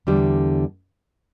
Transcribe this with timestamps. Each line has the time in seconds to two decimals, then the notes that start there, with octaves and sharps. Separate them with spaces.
0.07 E2 D3 G3